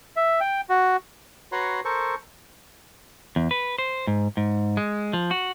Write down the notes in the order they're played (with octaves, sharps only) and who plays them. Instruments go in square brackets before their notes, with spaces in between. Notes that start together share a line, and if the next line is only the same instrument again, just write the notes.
[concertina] E5
G5
F#4
F#4 B4 C#5 A#5 C6
A4 A#4 C5 C#6
[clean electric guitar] E2
B4
C5
G#2
G#2
G#3
F3
F#4